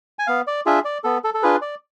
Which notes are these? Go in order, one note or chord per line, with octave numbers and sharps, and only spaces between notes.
G#5
B3 F5
D5
D4 F4 G#4 E5
D5
B3 A4
A4
A4
D4 F4 G#4 B4
D5